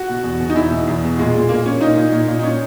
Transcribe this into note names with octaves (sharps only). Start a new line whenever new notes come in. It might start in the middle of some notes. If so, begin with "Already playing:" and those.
Already playing: F#4
B2
E2
B2
D#4
E2 E4
B2
E2
B2
A#2 G#3
A#2
A#2 A#3
A#2 C#4
A#2 D#4
A#2
A#2
A#2
D#4
C#4